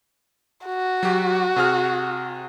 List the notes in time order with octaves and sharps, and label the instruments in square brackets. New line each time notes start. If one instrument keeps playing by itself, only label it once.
[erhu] F#4
[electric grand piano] F#3 G4
C3 G#4 F6